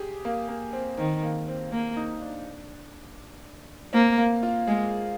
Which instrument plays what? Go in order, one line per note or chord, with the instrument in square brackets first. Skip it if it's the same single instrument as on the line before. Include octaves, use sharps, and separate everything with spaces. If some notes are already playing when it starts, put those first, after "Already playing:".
Already playing: [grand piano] G4 G#4
A#3
A#3
C4
[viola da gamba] D#3 [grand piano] C4
[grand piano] A#3
C4
[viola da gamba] A#3 [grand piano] C4
[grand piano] D#4
D4
[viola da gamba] A#3 [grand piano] C4
[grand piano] A#3
F4
[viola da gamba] G#3 [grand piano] G#4